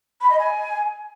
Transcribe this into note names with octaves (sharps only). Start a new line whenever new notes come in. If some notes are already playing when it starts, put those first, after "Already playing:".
B5
D#5
G#5